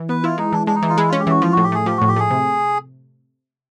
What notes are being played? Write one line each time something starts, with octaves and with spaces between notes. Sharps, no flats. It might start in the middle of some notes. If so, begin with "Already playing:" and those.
Already playing: E3
B3 B4
E4 F4
G#3 D#4
E3 D4
G#3 D4
D#4
E3
F4
G#3 E4
C#4 F4
G4
E3 F#4
F3 F4
A2 F#4
G4
A3 G#4
F3 G4
A2 F#4
G4
A3 G#4
C3